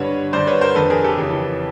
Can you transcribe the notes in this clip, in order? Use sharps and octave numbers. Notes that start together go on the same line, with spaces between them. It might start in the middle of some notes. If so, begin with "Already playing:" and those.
Already playing: G2 D3 B4 C#5
G2 D3 C5 D5
B4 C#5
A#4 C5
F2 D3 A4 B4
G#4 A#4
G4 A4
F2 C#3 E3